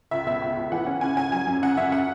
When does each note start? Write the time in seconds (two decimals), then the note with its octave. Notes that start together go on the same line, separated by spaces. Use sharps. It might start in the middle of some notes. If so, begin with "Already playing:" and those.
0.11 C#2 E5
0.27 B2 E5
0.42 C#2
0.57 C#2
0.72 E3 F#5
0.87 C#4
1.01 C#3 G#5
1.17 C#4 G#5
1.32 F#3 G#5
1.47 F#2
1.62 C#3 F#5
1.77 F#2 E5
1.92 F#5